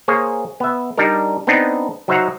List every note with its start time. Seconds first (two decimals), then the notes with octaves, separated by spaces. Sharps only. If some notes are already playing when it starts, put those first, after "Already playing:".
0.08 A#3 G#4 C5 C#5
0.60 B3 E5
0.97 G3 D4 D#4 A#4
1.47 B3 C4 D4 D#4
2.08 F#3 D#4 C5 E5 F#5 A#5